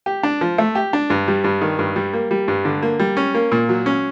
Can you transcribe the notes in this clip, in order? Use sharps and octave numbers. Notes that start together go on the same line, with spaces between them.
G4
D4
F3
A3
G4
D4
G2
G3
G2
D#3
G2
G3
A#3
G3
G2
D3
A#3
G3
C#4
A#3
A#2
F#3
C#4